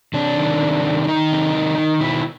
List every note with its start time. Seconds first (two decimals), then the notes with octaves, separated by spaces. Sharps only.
0.14 C3 D4
0.37 D#3
0.61 C3
0.84 D#3
1.04 D4
1.07 D#3 D#4
1.32 C3
1.55 D#3
1.78 D#3
2.01 B2 E4